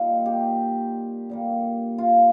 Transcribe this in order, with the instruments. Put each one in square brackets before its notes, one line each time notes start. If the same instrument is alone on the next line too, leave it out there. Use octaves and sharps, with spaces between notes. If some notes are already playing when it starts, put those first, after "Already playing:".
Already playing: [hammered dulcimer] A#2 G3 A#3 D#4 F4
G4
D3 G3 A#3
F4